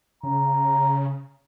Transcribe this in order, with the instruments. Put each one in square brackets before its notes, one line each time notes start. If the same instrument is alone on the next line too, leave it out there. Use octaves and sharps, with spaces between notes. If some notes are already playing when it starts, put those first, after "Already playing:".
[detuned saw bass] C#3 [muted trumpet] A#5